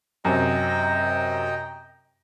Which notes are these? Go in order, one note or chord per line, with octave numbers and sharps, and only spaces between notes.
F#2 C3 D#5 G5 A#5